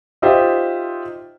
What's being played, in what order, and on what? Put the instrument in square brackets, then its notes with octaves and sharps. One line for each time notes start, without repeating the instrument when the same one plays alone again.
[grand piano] D#4 F4 G4 C5 E5